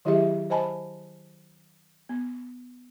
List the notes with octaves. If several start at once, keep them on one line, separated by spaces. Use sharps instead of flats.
D#3 F#3 E4 G4 G#4 E5
C5 D#5 G#5 A5 B5
B3